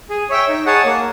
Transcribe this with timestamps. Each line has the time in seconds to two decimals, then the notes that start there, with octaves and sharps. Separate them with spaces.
0.10 G#4
0.30 C#5 E5 G5
0.48 D#4
0.66 G#4 C#5 F#5 A5
0.85 A#3